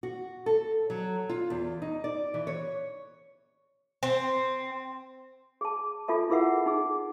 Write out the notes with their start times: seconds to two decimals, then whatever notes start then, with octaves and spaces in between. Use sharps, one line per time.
0.03 F#4
0.46 A4
0.90 F#3
1.29 F4
1.50 E2
1.82 D#4
2.04 D5
2.34 E3
2.47 C#5
4.03 C4
5.61 G#4 A5
6.08 F4 A4 E5 A5
6.30 E4 G#4 A#4 E5 F#5
6.66 D#4 G#4